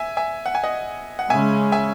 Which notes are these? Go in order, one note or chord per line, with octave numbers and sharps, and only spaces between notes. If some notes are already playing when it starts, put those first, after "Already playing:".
Already playing: E5 G#5
E5 G#5
F#5
G#5
D#5 F#5
F#5
C#3 G#3 C#4 E5 G#5
E5 G#5